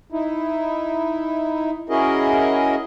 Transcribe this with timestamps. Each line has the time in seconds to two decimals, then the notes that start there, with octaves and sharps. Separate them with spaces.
0.12 D#4 E4
1.89 C#4 E4 F#4 G#4 A#4 D#5